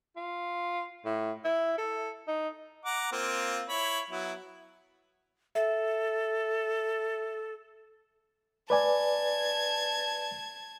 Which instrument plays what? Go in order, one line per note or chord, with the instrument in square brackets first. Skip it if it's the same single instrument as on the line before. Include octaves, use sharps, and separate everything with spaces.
[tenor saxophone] F4
A2
E4
A4
D#4
[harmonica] F#5 A#5 D6
A#3 C4 F4
E4 C#5 B5
F#3 B3 E4
[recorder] A4 [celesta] E5
[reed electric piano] B4 D5 G#5 [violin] A5 G#6